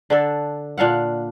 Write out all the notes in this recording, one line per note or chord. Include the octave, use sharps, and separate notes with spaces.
D3 D4 A4
A#2 D4 F5 F#5